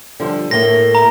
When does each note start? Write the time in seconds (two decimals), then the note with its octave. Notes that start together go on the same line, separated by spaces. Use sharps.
0.20 D3 F3 G3
0.51 A2 A3 A#3 A#6 G7
0.95 A#5